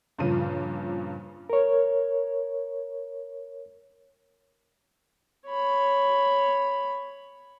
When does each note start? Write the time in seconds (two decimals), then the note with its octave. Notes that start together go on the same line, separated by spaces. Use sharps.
0.19 G2 A#2 C#3 F3 D#7
1.50 A#4 C#5
5.47 C#5 B5